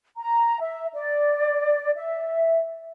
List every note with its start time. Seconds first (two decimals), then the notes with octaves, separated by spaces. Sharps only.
0.17 A#5
0.61 E5
0.93 D5
1.96 E5